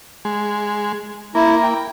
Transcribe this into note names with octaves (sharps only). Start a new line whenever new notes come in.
G#3
A#3 E4
G5